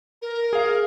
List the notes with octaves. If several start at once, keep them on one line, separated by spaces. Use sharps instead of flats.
A#4
G#4 F5